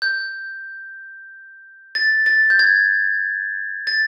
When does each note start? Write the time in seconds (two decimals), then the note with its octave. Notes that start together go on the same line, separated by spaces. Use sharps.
0.02 G6
1.95 A6
2.26 A6
2.50 G6
2.59 G#6
3.87 A6